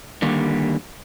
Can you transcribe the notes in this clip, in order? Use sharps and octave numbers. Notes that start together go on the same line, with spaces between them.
D3 D#3 G3 A#3